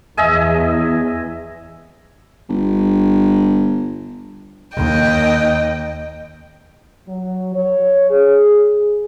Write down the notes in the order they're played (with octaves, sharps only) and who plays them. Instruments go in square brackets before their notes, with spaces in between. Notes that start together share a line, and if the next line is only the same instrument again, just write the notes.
[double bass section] E2 [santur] D#5 E5 G#5
[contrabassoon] G1
[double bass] D#2 [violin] D#5 G5
[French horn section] F#3
C#5
G#4